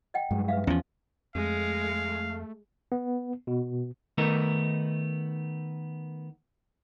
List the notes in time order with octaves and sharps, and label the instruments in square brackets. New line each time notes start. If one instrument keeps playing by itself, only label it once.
[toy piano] D#5 F#5 G5
[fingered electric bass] G2 F#3 G#3
[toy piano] B4 E5 F5
[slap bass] E2 F3 [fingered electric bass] C#4
[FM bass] F2 [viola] G#3 [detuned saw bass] A3 [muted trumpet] F5
[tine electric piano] B3
B2
[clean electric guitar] D#3 A3 B3 D#4 A#4